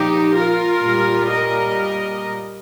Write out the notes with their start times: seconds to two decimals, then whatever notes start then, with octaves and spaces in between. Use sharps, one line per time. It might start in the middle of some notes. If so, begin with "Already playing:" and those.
Already playing: A#2 F3 D#4 G4
0.35 F4 A#4
0.82 A#2 G3
1.30 A#4 D#5